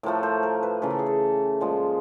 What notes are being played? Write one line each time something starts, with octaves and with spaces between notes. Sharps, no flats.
A2 F3 A3 A#4
C5
A#4
B4
C#3 E3 A3 A#4
A4
G#4
A4
A#2 F3 G#3